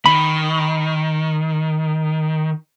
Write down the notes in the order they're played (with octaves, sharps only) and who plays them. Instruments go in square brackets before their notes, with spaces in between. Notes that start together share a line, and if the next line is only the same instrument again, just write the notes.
[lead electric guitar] D#3 [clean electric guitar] B5